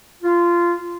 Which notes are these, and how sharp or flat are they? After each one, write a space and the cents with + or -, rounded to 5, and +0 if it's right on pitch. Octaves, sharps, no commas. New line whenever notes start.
F4 -15